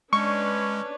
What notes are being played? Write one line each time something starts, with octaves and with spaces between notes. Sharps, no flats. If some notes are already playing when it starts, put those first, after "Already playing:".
G#3 C#4 D4 B4 C#5 C#6